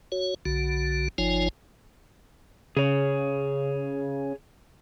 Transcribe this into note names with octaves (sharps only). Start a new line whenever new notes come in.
F#4 C#5
B1 D3 F#4
G1 F3 D#4 F4 C#5 G#5
C#3 G#4 C#5